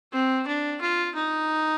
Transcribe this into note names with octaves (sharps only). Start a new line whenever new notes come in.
C4
D4
F4
D#4